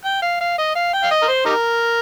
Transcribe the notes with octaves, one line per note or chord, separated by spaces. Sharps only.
G5
F5
F5
D#5
F5
G5
F5
D#5
A#4
C5
D#4 G4 A#4